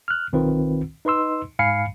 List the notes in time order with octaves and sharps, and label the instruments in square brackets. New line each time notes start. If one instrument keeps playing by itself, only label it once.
[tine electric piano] F6 F#6
B1 D#3 C4 F4 B4
D#4 B4 D#5 C6 E6
G#2 F5 G#5 B5 C7 C#7